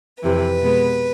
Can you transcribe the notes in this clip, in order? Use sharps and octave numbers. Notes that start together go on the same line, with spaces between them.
F2 C3 E3 B4
B2 G#3 B3